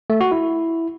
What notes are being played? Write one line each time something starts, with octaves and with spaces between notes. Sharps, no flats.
A3
F#4
E4